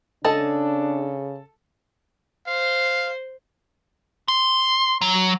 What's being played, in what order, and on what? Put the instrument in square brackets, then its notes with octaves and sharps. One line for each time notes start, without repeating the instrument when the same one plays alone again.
[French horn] C#3 [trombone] D4 [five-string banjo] G#4 D#5 A5 [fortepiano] A4
[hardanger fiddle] C5 [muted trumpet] F5
[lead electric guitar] C6
F#3